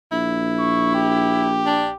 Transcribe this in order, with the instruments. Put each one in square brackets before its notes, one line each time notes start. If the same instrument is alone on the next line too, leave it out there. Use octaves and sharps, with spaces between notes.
[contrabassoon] A#1 [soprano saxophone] E4
[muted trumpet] C#6
G4
[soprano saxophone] D4